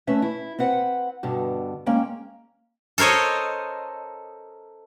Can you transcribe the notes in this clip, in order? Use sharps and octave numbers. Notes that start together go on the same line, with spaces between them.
A3 C#4 B4 E5
E4
C4 B4 F#5
G2 B2 D3
G#3 A#3 C#4 G5
A4 A#4 C5 C#5 D#5